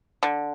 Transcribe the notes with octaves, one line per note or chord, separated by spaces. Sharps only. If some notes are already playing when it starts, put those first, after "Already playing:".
D3